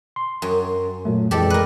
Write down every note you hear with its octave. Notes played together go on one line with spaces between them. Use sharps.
C6
F#2
A#2 F#3 A3
F2 E3 G#3 G4 A4 D5
A#4 B4